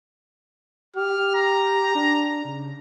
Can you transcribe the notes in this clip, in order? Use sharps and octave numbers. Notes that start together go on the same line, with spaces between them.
G4 F6
A#5
D4
C#3